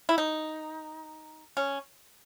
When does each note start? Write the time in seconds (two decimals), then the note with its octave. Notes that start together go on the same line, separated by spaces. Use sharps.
0.09 E4
0.18 D#4
1.57 C#4